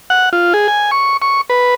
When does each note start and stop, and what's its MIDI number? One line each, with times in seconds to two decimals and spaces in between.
0.10 0.29 78
0.33 0.53 65
0.54 0.67 68
0.68 0.91 80
0.91 1.17 85
1.22 1.41 85
1.50 1.75 71